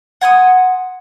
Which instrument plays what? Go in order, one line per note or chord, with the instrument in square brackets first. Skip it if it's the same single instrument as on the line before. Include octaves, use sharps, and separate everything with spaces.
[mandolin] F#5 G#5 C6 D#6